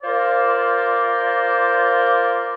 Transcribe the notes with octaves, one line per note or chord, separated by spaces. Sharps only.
F4 A#4 C5 D5